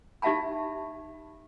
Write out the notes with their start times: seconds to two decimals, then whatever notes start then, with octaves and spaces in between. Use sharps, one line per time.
0.22 D#4 G4 E5 F5 A5 B5